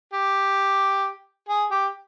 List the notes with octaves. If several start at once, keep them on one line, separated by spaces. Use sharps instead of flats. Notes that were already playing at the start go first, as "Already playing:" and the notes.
G4
G#4
G4